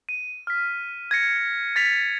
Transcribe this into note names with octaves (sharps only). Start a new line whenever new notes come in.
D#7
F6 B6
G#6 A#6 C#7
A6 B6 F7